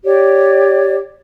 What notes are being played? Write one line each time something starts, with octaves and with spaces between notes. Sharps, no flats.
G4 C#5 D5